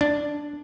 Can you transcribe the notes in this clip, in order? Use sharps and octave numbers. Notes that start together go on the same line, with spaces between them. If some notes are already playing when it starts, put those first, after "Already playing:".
D4